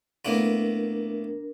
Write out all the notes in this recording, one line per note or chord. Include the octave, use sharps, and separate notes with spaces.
A2 A#3 B3 D4 A#4